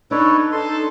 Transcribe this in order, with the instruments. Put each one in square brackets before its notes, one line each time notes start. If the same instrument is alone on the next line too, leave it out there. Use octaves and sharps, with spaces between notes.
[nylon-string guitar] D4 [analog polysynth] D#4 [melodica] A4 B4 C#5
[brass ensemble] A4 [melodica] C6